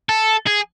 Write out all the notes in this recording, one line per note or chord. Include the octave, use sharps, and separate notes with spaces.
A4
G#4